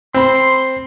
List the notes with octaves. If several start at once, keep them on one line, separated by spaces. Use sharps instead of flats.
C4 B5 C6